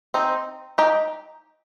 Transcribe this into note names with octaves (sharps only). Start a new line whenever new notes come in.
C4 D#4
D#4 G4